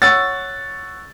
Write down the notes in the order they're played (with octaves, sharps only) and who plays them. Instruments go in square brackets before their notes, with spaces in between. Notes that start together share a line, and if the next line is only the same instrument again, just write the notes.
[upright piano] C#5 F#5 E6 [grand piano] A6